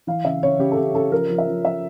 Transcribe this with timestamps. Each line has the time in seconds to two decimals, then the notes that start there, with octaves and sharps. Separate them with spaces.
0.07 E3 F5
0.24 C#3 E5
0.43 C#3 C#5
0.59 C#3 G4
0.72 A4
0.77 C#3 G4
0.94 C#3 A4
1.12 F3 A#4
1.30 F3
1.38 E5
1.47 F3
1.64 F3 E5